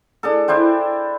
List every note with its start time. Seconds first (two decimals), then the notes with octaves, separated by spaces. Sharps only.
0.23 D4 G#4 A4
0.48 D4 E4 C5 G5